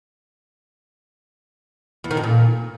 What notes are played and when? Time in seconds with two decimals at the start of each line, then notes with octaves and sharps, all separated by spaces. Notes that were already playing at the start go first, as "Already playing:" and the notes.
2.04 E2
2.11 D#3
2.17 F2
2.24 A#2